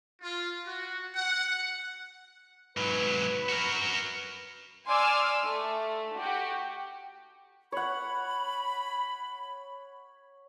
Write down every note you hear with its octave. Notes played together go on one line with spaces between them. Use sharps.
F4
F#4
F#5
G#2 F#3 B4
F#4 A#4
D5 G#5 C6 D6 E6 F6
A3
F#4 G4
C#5 F#5 B5